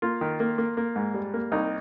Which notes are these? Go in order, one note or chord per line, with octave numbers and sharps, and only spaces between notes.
A#3 F4
D#3
A#3
A#3
A#3
G#2
G3
A#3
C2 D#4